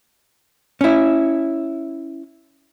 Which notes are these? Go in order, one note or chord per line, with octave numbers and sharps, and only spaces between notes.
C#4 E4